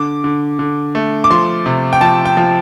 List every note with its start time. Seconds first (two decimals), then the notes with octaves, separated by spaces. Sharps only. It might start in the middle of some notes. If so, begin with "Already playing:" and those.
Already playing: D3 D6
0.24 D3
0.59 D3
0.95 A3
1.24 D6
1.30 F3 C6
1.66 C3
1.93 G5
2.01 F3 A5
2.25 G5
2.37 F3